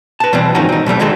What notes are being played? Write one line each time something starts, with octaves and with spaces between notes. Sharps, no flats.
B4 A5
B2 E3 G3 C4
G#2 D#3 F3 C#4 D#4 F#4
C4 D#4
B2 F#3 G3 A3
D3 D#3 G#3 C4 F#4 A4